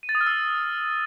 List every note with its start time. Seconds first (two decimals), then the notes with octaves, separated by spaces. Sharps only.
0.03 D#7
0.09 A6
0.15 D#6
0.21 F6
0.27 E6